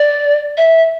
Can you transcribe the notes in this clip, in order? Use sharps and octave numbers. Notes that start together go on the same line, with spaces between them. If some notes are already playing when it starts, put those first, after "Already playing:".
Already playing: D5
E5